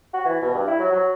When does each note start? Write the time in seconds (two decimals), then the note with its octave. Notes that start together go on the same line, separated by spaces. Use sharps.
0.13 F#4
0.25 E3
0.42 B2
0.54 G2
0.67 E4
0.79 F#3
0.92 F#3